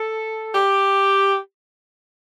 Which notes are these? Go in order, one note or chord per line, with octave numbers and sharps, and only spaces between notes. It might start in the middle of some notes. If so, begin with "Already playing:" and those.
Already playing: A4
G4